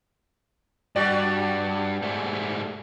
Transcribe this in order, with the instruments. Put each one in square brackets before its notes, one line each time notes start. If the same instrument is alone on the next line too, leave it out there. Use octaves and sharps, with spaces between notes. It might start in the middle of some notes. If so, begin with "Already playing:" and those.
[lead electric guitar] G2 [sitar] G3 F#4 D5
[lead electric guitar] G#2 A3